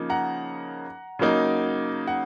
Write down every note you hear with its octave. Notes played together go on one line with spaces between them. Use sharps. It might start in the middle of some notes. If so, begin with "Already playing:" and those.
Already playing: C#3 F3 A#3 D#4
F#5 A#5
C#3 F#3 A#3 D#4
F#5